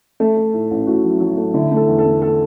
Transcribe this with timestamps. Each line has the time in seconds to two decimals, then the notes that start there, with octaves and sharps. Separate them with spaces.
0.20 A3 A4
0.37 A3
0.53 A2
0.71 A1
0.87 A2 F#4
1.04 F#3
1.20 F#3
1.37 A3
1.54 D3 E4
1.71 A3
1.77 A4
1.87 E2
1.99 A4
2.05 A3
2.22 A4